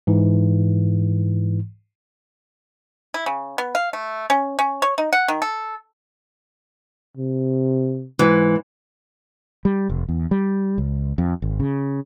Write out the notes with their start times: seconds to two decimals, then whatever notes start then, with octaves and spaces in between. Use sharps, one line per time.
0.07 G#2 E3
3.14 E4
3.26 C#3
3.58 B3
3.75 F5
3.93 A3
4.30 C#4
4.59 C#4
4.82 C#5
4.98 D#4
5.13 F#5
5.28 D#3
5.42 A4
7.17 C3
8.19 G#2 E3
9.65 G3
9.90 F1
10.09 E2
10.31 G3
10.78 C#2
11.18 F2
11.42 G#1
11.60 C#3